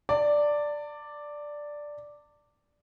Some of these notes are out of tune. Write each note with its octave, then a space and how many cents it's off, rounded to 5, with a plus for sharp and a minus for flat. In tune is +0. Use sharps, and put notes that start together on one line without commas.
D5 +0 A5 +45